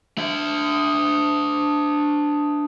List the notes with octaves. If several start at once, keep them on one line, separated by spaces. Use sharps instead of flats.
D4 E5